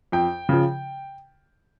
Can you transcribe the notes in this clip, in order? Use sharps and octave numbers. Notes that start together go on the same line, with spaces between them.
F2 G5
C#3 F3